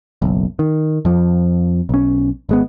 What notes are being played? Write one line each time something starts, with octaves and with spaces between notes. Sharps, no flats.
F#1 B1
D#3
F2 F3
B1 C#4
G#1 G#3 B3